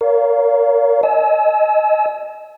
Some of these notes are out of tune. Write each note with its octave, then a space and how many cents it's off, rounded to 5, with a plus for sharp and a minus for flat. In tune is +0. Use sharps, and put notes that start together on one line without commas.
A#4 +0 C#5 +40 F5 +0
D#5 +0 G#5 +35 E6 -20